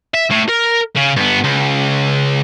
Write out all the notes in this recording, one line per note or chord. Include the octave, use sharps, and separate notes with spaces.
E5
A2
A#4
C#3
G2 B3
C#2